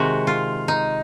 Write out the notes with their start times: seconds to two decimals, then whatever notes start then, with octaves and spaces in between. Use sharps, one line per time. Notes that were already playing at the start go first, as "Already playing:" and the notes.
Already playing: C3 D#3 G#3 F#4
0.27 F4
0.68 D#4